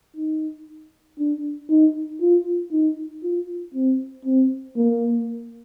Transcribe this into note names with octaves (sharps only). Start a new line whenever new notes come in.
D#4
D4
D#4
F4
D#4
F4
C4
C4
A#3